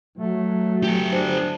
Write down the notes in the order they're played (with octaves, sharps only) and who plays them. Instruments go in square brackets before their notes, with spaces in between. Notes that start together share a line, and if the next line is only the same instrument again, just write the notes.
[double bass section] F#3 [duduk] A3
[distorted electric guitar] G4 A4
[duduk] D4 [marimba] C5